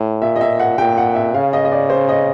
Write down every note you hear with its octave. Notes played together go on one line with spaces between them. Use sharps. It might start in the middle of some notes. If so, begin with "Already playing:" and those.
Already playing: A2
A#2 E5
D#5
E5
F#5
A#2 G5
F#5
E5
C#3 F5
D#5
D#5
D5
C5
D#5